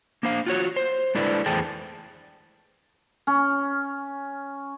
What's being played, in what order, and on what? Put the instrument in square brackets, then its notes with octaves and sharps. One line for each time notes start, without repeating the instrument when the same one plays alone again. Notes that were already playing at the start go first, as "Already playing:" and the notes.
[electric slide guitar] A#3 D4 C5 F5
F4 F#4 C#5
C5
G#3 D4 E4 A4 B4 D5
E2 A3 G#4 C5 G5 A5
[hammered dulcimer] C#4